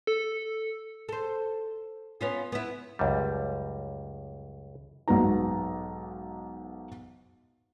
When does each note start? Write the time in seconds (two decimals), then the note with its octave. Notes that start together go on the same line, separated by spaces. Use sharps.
0.07 A4
1.09 A4 C5
2.21 B3 C#4 F4
2.52 B3 E4
2.99 C#2 F#2 G3
5.08 B1 G#2 F#3 B3 D#4 A#5